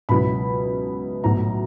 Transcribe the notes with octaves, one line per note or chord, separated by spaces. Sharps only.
C#2 B2 F#3 B3 E4 B5
B1 A2 F#3 A#5